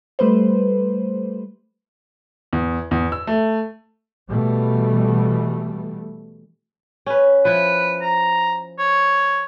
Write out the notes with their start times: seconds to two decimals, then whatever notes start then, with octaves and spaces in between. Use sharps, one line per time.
0.19 G3 A3 B4 C5
2.53 E2
2.91 E2
3.12 E6
3.27 A3
4.29 B2 E3 G3 A3
7.06 C#4 B4
7.45 F3 E4 B4
8.02 A#5
8.79 C#5